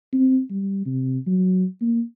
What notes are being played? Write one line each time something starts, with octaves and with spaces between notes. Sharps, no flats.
C4
G3
C3
F#3
A#3